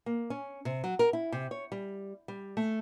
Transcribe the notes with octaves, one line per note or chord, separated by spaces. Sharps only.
A#3
C#4
C3
F#3
A#4
E4
C3
C#5
G3
G3
A3